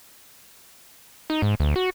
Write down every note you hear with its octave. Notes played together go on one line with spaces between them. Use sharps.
D#4
G#2
D2
F#4